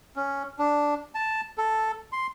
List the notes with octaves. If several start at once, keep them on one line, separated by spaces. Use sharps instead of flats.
C#4
D4
A5
A4
C6